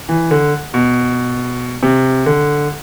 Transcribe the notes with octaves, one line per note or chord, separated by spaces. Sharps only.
E3
D3
B2
C3
D3